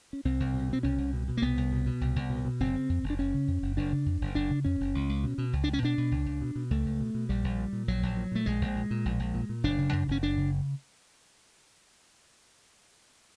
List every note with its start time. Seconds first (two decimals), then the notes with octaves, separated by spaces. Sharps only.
0.13 C#4
0.25 C2 C4
0.40 C2
0.54 B2
0.69 B2 C4
0.83 C2 C#4
0.98 C2
1.13 B2
1.28 B2
1.37 A#3
1.42 C2 B3
1.57 C2
1.72 B2
1.86 B2
2.01 C2
2.16 C2
2.30 B2
2.45 B2
2.60 F#1 C4
2.74 C#3
2.89 F2
3.03 F#1
3.10 D4
3.19 F#1 C#4
3.34 C#3
3.48 F2
3.62 F#1
3.77 F#1 D4
3.92 C#3
4.06 F2
4.21 F#1
4.35 F#1 D4
4.50 C#3
4.65 F2 C#4
4.80 F#1
4.95 C#2
5.09 C#2
5.24 B2
5.38 B2
5.53 C#2
5.64 C#2 D4
5.73 C#4
5.82 B2 D4
5.98 B2
6.11 C#2
6.26 C#2
6.41 B2
6.56 B2
6.71 C#2 A3
6.86 C#2
7.00 B2
7.14 B2
7.29 A#1 G3
7.44 A#1
7.58 A#2
7.73 A#2
7.87 A#1 F#3
8.03 A#1
8.17 A#2
8.32 A#2 A3
8.46 A#1 G#3
8.61 A#1
8.76 A#2
8.91 A#2
9.05 A#1
9.20 A#1
9.34 A#2
9.49 A#2
9.64 F#1 D4
9.78 C#3
9.93 F#2
10.08 F#1 C#4
10.23 F#1 D4
10.37 C#3